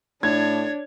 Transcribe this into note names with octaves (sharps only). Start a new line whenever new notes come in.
A2 D4 C#5 G#6